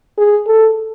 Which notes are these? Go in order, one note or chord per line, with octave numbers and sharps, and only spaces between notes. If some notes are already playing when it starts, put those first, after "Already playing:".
G#4
A4